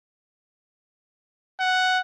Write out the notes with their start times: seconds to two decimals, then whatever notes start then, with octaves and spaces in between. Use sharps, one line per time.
1.60 F#5